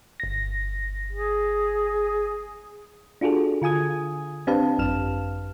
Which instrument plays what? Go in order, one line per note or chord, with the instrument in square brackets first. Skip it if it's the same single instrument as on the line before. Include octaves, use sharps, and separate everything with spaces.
[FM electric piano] G1 A#6
[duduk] G#4
[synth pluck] D4 F4 F#4 G#4 A4
D3 F4 G#5 D#6 G#6
C4 D4 G4 B4 F5 A5
G#1 F#2 F6 E7